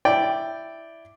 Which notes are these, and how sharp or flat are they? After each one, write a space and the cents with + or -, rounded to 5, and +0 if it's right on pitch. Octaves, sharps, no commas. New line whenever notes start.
E4 +0 D5 +0 G5 +0